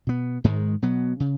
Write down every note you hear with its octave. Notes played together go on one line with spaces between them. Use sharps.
B2 B3
G#2 D#3 G#3
B2 F#3 B3
C#3